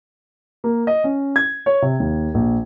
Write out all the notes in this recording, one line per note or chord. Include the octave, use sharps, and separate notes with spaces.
A#3
D#5
C#4
G#6
C#5
C3
D#2
A#1